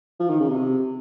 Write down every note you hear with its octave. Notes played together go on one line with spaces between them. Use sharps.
F3
D#3
C#3
C3